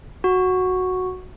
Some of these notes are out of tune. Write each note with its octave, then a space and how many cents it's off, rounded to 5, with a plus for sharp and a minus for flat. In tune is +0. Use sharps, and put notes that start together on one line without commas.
F#4 -5